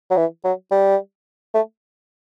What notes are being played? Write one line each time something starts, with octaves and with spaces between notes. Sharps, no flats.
F#3
E3
F#3
G3
A3